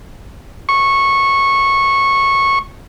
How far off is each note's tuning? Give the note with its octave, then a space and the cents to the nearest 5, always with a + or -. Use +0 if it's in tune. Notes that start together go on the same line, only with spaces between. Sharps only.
C#6 -15